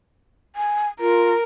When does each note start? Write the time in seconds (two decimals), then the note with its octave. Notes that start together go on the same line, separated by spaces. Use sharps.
0.56 G#5
1.00 F4 A#4